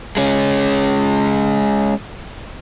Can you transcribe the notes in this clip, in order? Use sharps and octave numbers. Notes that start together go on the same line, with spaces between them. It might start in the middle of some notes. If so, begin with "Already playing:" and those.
G#3 C#4